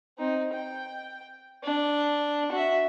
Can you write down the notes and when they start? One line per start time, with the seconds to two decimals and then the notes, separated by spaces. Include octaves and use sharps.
0.18 C4 D#4
0.53 G5
1.63 D4
2.52 F#4 E5